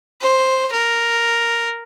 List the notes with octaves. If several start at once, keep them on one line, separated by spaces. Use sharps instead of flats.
C5
A#4